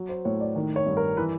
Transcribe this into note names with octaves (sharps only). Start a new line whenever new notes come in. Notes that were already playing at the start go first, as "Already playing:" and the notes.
Already playing: F#3
C5
A2 C#5
D5
D#3
C#5
G2
A#4
E3 B4